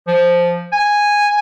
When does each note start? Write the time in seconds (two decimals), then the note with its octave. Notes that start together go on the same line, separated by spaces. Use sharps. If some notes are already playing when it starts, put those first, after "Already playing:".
0.07 F3
0.72 G#5